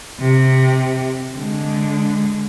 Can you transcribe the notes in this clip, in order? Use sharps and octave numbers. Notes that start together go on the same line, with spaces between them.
C3
D3 G#3